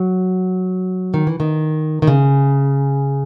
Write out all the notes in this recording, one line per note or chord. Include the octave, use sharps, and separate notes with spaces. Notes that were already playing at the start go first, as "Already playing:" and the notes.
Already playing: F#3
D#3
E3
D#3
D#3
C#3